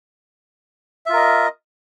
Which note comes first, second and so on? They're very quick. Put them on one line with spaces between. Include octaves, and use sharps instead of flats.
E5 F4 A#4 D#5